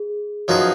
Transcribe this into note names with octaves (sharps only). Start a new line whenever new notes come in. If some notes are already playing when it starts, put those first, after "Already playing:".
Already playing: G#4
F#2 F3 B3 D#4 F#4 G#4